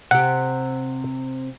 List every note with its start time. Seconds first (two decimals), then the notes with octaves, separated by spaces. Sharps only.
0.11 C3 G4 F#5